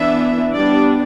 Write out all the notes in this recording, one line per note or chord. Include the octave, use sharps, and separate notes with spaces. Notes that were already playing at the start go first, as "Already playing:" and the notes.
Already playing: E3 B3 D4 E5
G3 B3 D4 D5